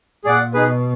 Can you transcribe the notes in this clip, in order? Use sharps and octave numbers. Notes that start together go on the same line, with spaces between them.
A#2 G#4 D5 F#5
B2 D#4 G#4 B4